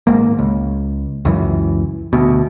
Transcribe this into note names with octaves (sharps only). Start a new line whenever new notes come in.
G#1 G#2 A#3
C#2
C#2 F#2 E3
D2 B2